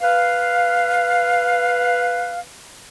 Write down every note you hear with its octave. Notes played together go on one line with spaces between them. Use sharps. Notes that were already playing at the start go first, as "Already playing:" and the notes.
B4 F5